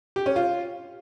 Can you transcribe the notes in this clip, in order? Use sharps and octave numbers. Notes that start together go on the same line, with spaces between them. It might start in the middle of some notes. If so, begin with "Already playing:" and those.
G4
C#4
F4